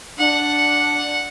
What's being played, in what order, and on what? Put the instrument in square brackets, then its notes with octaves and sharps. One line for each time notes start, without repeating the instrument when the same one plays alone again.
[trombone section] D4 [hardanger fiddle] F#5